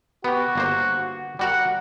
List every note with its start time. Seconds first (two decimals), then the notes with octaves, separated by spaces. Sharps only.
0.24 B3 F#4 G4
0.55 G1 A#3 C5
1.39 G3 F#4 A#4 F#5